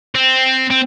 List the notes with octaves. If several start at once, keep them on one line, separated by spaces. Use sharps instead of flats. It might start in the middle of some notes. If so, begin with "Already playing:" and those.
C4
C4